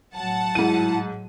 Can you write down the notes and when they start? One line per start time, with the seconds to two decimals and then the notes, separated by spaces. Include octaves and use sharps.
0.15 A2 F#3 F#5 A5
0.55 G#2 E4 D#7